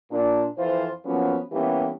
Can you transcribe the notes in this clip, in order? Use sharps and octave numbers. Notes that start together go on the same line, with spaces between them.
A#2 D4
F2 E3 F4 C5
F3 F#3 A#3 B3 C#4
G2 E3 A#3 B3 C#4 G4